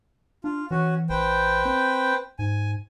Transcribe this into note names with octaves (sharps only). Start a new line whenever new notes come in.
D4 F4
E3 C#4 F#4
A1 B4 C5 G5
C4
G#2 G#5